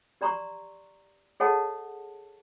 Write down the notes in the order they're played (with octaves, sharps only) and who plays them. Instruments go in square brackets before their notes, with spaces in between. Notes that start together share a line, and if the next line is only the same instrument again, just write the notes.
[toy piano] G4 D5 A#5 C6 C#6
G#4 A4 C#5 D#5 F#5 A5